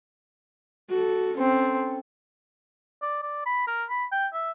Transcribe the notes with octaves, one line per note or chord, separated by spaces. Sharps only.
F#4 A4
C4 C#4 A4
D5
D5
B5
A#4
B5
G5
E5